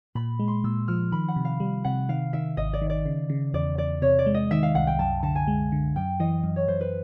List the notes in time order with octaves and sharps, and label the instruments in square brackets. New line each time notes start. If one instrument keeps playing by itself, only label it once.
[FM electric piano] A#2 [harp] B5
[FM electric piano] G#3
[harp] C6
[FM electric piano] A#2 [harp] E6
[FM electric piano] F3 [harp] F6
[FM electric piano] D#3 [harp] B5
[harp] F#5
[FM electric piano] C3
[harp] F5
[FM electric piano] G3
[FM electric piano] C3 [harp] F#5
[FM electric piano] D#3 [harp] F5
[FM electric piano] D#3 [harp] E5
[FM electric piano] G#1 [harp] D#5
[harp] D5
[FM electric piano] D#3
[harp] D5
[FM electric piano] C#3
C#3
[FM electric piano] E2 [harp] D5
[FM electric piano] E2 [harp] D5
[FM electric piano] C3 [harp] C#5
[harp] D5
[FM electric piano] G#3
[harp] D#5
[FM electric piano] D#3 [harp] E5
[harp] F5
[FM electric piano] C2 [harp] F#5
[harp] G5
[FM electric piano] F#2 [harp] A5
[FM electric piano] D3 [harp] A5
[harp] G#5
[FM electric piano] G#3
D3
[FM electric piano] F#2 [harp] G5
[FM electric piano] E3 [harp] D#5
[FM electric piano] F#2
[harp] C#5
[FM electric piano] F#2 [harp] C5
[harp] B4